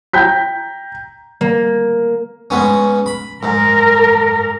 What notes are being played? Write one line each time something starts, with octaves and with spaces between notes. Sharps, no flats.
G5 A#5 G6 B6
A#3
G#2 B3 C#4
B5
G#2 A#4